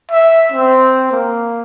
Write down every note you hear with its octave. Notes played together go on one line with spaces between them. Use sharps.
E5
C4
A#3